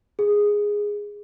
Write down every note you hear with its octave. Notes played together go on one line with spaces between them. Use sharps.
G#4